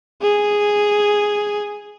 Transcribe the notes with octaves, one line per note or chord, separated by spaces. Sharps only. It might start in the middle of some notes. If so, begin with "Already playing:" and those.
G#4